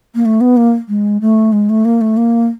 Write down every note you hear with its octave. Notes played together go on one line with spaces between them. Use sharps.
A#3
A3
B3
A#3
G#3
A3
G#3
A3
A#3
A3
A#3